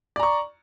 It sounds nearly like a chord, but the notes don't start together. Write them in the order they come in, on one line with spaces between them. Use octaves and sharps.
D5 A#5 C#6